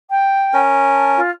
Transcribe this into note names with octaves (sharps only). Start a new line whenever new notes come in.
G5
C#4 A#4
A5
F4